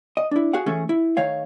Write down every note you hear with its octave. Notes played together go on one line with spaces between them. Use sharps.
D#5
D4 E4
F#4 G#4 F5 F#5
E3 A3 C#4 G#4 A4
E4
D#3 A3 C#5 F5